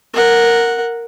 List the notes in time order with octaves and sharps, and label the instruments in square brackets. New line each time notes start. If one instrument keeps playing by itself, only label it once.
[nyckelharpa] A#4 F#5